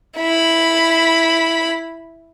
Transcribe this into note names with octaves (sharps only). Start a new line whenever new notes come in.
E4 B5